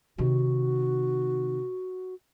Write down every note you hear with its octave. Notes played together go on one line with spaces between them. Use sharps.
C3 D#3 F#4